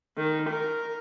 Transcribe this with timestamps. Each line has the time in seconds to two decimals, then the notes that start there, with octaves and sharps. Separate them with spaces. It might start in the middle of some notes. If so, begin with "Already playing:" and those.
0.17 D#3
0.49 A#4